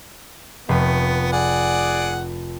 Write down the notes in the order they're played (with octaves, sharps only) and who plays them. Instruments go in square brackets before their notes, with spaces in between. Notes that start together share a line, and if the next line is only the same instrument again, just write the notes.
[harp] F1 C#6 D#7 [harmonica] B3
[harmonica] G#4 D5 F#5